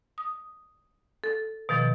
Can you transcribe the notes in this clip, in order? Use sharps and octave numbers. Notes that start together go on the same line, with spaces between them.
D#6
A4
B2 D#3 F3